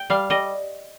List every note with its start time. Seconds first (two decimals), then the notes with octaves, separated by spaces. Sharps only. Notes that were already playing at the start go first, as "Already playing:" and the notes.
Already playing: G5
0.10 G3 F5
0.30 G3 D#5